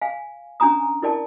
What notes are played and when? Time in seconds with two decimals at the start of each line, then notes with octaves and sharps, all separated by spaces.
0.02 F5 G#5
0.60 C#4 D4 G#5 A#5 D#6
1.03 E4 A#4 D5 G5 A5